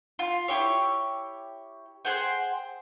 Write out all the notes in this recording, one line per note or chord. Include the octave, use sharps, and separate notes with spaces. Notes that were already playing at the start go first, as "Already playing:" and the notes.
F4
E4 G4 C#5
G#4 C5 F#5 G5